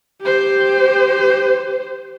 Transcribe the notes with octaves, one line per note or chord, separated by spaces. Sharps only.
G4 C5